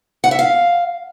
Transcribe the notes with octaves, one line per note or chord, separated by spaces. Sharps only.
F#5
E5
F5